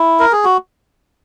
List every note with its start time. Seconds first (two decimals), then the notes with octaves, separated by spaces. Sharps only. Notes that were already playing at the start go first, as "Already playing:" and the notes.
Already playing: E4
0.20 A#4
0.32 G#4
0.44 F#4